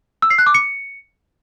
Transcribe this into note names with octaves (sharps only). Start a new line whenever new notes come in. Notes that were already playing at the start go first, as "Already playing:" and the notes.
E6
C7
F#6
D6
C#7